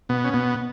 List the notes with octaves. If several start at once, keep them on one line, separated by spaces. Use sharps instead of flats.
B2 B3
C#4
B2 B3